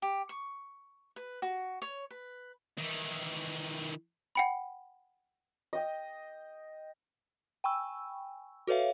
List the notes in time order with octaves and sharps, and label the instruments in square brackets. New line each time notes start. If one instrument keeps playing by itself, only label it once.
[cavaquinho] G4
C#6
B4
F#4
C#5
B4
[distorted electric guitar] D#3 E3
[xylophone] F#5 G5 B5
[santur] D#5 G5
[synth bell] G5 G#5 B5 C#6 E6
F#4 A4 B4 C#5 E5 F5